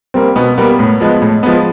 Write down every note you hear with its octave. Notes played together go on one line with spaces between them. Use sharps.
G3 A#3 C4
B2 B3
G3 A#3 B3
A2
F3 G#3 B3
A2
F3 G#3 B3